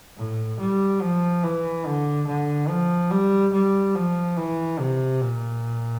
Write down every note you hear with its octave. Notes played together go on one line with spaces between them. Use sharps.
A2
G3
F3
E3
D3
D3
F3
G3
G3
F3
E3
C3
A#2